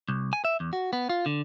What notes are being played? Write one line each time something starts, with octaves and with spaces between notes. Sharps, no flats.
C2
G#5
E5
E2
F#4
B3
F4
D3